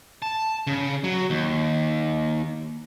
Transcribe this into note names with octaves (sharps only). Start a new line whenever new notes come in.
A5
C#3
F#3
D#2